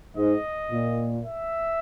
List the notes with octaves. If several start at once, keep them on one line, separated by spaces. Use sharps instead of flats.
G#2 D#5
A#2
E5